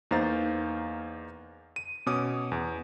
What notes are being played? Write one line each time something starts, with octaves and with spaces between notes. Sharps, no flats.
E2 A#3 D#4 C5 F5 A6
D#7
B2 C#4 D6 D#6
E2